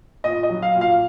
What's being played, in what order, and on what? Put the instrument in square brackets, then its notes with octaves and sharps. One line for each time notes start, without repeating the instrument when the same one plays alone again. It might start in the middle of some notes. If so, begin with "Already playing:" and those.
[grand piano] A#2 D#5
D#5
F#3
F5
A#2
F5